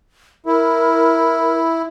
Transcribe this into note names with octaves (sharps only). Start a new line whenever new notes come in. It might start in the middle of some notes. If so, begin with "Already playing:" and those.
E4 A#4